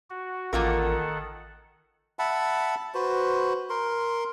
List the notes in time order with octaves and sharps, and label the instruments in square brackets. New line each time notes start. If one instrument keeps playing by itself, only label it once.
[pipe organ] F#4
[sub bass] A1 [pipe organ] D#3 A4 F#5 [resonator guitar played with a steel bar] A#3 F4 A#4
[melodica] E5 F#5 A5 B5
F#4 B4 C5
A#4 C6